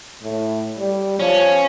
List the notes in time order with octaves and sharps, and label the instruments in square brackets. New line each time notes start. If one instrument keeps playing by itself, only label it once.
[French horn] A2
G3
[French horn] F3 [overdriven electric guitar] C#4